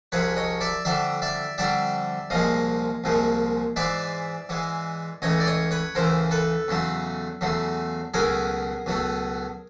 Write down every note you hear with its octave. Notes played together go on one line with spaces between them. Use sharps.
C2 C3 F3 G#3 B4 C#5
C#5 D#5
D5 E5
F2 D3 G3 D5 E5
D5 E5
F2 D3 G3 D5 E5
C2 A#2 F3 G#3 D#5 F5
C2 A#2 F3 G#3
G#2 E3 G#3 D5 E5
G#2 E3 G#3
C#2 C#3 E3 A3 C#5 D#5
D5
C#5 D#5
B4 C#5
C#2 C#3 E3 A3 A#4 C5
A4 B4
E2 C#3 F#3 A3
E2 C#3 F#3 A3
C#2 B2 F#3 A3 G#4 A#4
C#2 B2 F#3 A3